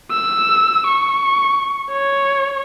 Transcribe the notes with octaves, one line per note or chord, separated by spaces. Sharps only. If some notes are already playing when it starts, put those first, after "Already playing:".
E6
C#6
C#5